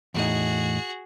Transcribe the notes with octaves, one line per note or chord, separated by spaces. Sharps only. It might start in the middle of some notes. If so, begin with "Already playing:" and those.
E2 A2 D#4 F#4 G#4